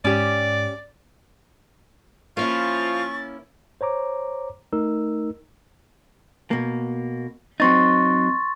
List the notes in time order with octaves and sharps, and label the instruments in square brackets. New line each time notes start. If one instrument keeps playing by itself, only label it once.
[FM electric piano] G#2 [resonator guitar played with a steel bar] C#4 G4 [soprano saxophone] D5
[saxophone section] F3 F4 [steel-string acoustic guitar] A#3 C#4 E4 [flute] C#6 [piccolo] A6
[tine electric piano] C5 C#5 A#5 D6
A3 D#4 A#4 E6
[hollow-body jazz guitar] B2 A#3
[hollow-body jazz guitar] F#3 C4 D#4 [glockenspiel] C6 C#6 A6